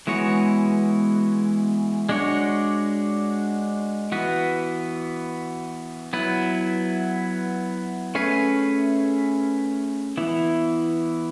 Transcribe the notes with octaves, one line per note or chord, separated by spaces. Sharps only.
E3 G#3 B3 F#4 C#5
G#3 D4 F#4 C#5
E3 B3 F#4 B4
F#3 B3 E4 B4
A3 C#4 G#4 B4
E3 B3 E4